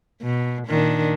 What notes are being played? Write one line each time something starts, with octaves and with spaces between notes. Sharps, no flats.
B2
A#2 D#3 D4